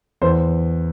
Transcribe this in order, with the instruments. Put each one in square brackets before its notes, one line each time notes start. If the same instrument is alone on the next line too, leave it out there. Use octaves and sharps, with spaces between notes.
[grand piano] E2 C5